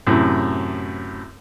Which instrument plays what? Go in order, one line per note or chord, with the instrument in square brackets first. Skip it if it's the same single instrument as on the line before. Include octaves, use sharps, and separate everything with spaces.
[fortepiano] F#2 A2 C3